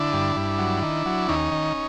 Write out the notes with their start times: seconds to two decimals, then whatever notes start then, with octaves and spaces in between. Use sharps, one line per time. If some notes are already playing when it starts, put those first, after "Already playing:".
Already playing: D3 D4 E4
0.13 G2
0.36 G2
0.59 F#3
0.82 D#3
1.06 F#3
1.28 D#2 C#4 D#4
1.51 D#3